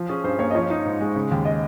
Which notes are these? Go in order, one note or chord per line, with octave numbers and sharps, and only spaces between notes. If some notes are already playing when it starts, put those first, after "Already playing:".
Already playing: F3
C#4 G#4
G2 C5
A#3 C#5
D#5
F3 C#5
D#4
G#2
G#3
C#3
D#2
D#5